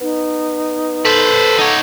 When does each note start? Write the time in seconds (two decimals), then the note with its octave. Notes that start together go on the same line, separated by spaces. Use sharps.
0.01 B3 D#4
1.05 A4 B4 C5
1.58 D#4 C#5 F#5